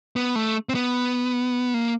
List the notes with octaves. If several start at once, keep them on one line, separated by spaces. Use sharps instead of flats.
B3
A3
C4
B3
A#3